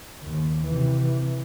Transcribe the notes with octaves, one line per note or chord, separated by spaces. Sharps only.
D#2
C3 E3